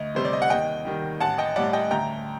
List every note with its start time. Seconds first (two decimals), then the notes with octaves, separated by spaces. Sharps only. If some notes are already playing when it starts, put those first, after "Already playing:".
Already playing: D2 D#5
0.15 C3 G3 C5
0.25 D5
0.33 D#5
0.42 F#5
0.50 D#2 D#5 G5
0.85 D#3 G3
1.20 A1 F#5 A5
1.38 D#5 G5
1.56 A2 G3 D5 F#5
1.73 D#5 G5
1.91 D2 G5 A#5